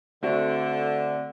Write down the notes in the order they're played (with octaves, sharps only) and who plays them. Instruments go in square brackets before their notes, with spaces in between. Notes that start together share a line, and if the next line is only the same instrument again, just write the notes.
[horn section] D3 [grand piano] A3 C4 F#4